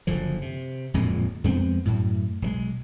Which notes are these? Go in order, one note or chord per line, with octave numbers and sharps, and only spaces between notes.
F#1 D3 F3
C3
D1 F2 A#2 G#3
F2 G#3 B3 C4
F#2 A2
B1 F3 G#3